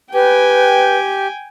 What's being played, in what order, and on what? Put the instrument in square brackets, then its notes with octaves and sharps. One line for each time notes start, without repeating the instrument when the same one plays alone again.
[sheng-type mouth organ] G4 [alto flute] B4 [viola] G5 G#5